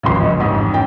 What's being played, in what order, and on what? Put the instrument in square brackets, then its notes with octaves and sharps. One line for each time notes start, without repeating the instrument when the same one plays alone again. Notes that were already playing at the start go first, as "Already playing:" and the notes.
[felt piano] D#1 F3 C6 [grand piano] G#1 C#2 C#3
[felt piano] A#1 D#5 C#6
[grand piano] A1 F2 G#2 [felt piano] D#6
[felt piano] C#4 F4 G5